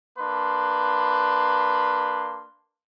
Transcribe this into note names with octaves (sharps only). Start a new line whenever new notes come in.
A#3 D4 B4 C6